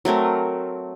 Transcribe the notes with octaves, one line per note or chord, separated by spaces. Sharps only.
F#3 A3 C4 A#4